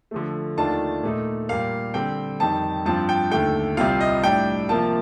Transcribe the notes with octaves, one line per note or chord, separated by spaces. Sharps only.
D3 F3 A3
D#2 D#3 A3 D4 F4 A5
A#2 A3 D#4
A#2 G3 A#3 F5
D3 G3 C4 G5
F2 D#3 G3 A5
G2 F3 C4 F4 A5
G5
D#2 D3 A3 G5
C2 C3 G3 C4 F4 F5
D#5
A2 G3 D4 G5
C3 F3 A#3 F4 A5